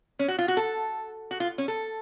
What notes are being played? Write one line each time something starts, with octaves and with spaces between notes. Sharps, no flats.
C#4
F#4
F4
F#4
A4
F#4
F4
C#4
A4